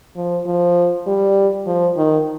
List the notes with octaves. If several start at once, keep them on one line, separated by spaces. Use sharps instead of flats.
F3
F3
G3
F3
D#3